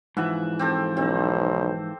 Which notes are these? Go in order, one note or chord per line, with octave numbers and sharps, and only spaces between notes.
G#2 E3 F3 E5 F#5
C4 G4 A4
B1 C4